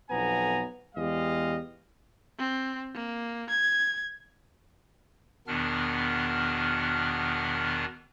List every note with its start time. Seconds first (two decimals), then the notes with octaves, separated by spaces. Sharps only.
0.10 B1 F2 B3 G#5 A#5
0.95 E2 G#3 G4 D#5 F5
2.39 C4
2.94 A#3
3.50 G#6
5.47 E2 B2 D#3 B3 D4 F6